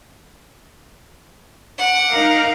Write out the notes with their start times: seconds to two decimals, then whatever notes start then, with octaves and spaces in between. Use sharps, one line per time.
1.78 F#5 D6
2.12 D#4 A#4 F5